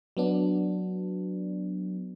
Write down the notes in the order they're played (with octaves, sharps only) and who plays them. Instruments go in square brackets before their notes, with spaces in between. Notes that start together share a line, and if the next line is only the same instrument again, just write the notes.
[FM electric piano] F#3 B3 D4